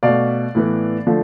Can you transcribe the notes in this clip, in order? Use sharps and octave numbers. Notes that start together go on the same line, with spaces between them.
B2 A3 D5 F5
A2 E3 B3
D3 F3 A3